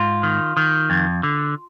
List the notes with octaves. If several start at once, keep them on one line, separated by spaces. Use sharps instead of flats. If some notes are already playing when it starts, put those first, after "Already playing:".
Already playing: G#2 F4
D#3
D#3
F2
D3